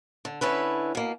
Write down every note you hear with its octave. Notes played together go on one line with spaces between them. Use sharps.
D3
D3 C#4 E4 B4
B2 A#3